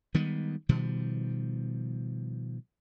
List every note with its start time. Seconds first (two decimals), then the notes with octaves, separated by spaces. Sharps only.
0.14 D#3 G3 G#3 B3
0.69 B2 D#3 F3 G3